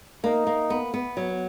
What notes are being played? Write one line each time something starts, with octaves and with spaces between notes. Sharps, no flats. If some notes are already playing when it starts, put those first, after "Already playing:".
A#3 D#4
A#3
B3
B3
F#3